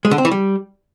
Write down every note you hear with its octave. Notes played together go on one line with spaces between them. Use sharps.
G#3
D3
C4
E3
G3